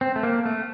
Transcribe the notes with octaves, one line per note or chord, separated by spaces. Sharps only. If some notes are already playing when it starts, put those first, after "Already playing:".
C4
A3
A#3
A3